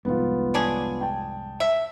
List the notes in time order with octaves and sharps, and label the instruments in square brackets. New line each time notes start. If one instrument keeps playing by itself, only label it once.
[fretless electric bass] C2 F2 G#2 [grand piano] B3 F4
[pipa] C#4 D4 G#4
[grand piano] G5 A5
[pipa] E5